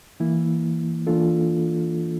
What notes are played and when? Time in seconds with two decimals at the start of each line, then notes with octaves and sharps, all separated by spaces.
0.20 E3 A#3 E4
1.07 E3 A#3 D4 F4 A4